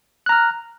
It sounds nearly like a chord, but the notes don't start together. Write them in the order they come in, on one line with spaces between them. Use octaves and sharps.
F#6 A#5 F6